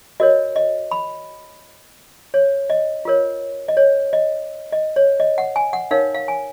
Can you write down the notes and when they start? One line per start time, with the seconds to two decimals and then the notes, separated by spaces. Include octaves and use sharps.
0.20 F#4 A#4 C#5 D#5
0.56 D#5
0.91 B5
2.34 C#5
2.70 D#5
3.05 F4 A#4 C#5
3.68 D#5
3.77 C#5
4.13 D#5
4.72 D#5
4.96 C#5
5.20 D#5
5.38 F#5
5.56 G#5
5.73 F#5
5.91 D#4 A#4 C#5 F5
6.15 F5
6.28 G#5